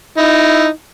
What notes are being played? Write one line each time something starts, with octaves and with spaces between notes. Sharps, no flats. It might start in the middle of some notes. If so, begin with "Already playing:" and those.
D#4 E4